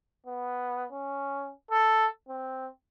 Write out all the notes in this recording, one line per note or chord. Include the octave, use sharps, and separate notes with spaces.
B3
C#4
A4
C4